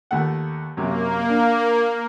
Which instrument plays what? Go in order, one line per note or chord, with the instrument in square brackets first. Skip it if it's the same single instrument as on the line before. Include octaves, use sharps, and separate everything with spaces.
[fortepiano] D#2 A3 F#5
[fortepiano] F#2 C3 F#3 [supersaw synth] A#3
[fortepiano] D4